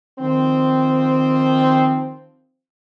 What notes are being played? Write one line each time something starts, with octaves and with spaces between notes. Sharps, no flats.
D#3 F3 C4